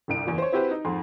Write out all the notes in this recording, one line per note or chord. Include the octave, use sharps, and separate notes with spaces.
G1 C2 D7
F#1 E2
C5 C#5
C4 E4 F#4 G4 B4 C5
D#4
F2 G#2 C6